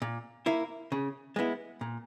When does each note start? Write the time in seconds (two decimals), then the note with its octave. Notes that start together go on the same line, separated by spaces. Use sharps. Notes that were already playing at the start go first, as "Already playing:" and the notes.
0.02 A#2
0.46 A#3 E4
0.92 C#3
1.36 G#3 B3 E4
1.81 A#2